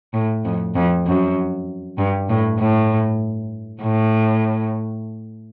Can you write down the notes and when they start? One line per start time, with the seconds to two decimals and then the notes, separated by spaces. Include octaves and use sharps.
0.14 A2
0.45 F2
0.75 F2
1.06 F#2
1.98 G2
2.29 A2
2.59 A2
3.82 A2